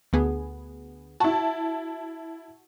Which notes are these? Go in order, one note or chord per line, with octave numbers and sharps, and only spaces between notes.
D2 B3 G#4
E4 F#4 A5